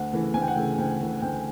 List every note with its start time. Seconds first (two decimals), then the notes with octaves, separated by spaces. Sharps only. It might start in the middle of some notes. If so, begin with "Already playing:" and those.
Already playing: D2 F#5
0.13 C#3 E3 A3
0.34 D2 G#5
0.42 G5
0.48 F#5
0.55 C#3 E3 A3 G5
0.78 D2 G5
1.00 C#3 E3 A3
1.21 D2 G5